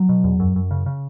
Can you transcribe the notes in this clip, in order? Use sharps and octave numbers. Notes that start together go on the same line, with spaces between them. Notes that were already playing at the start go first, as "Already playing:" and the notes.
Already playing: F#3
B2
E2
F#2
F#2
C#3
C#3